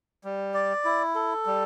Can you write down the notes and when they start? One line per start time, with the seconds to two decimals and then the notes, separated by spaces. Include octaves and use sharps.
0.24 G3
0.54 D5
0.85 E4
1.15 A4
1.46 G3